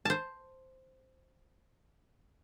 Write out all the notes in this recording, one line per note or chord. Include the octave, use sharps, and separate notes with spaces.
C5 A5